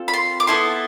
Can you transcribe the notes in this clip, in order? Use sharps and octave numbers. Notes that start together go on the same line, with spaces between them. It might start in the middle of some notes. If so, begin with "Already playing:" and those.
Already playing: C4 F4 A4
B5
C6
D6
B3 E4 A4 C6